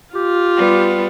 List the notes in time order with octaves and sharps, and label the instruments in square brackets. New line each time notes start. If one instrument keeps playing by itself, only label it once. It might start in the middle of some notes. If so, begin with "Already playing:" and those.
[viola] F4 [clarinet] G4
[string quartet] G3 B3